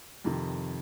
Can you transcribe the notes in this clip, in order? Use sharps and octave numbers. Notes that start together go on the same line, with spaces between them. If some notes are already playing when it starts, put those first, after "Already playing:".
F2 C3 D#3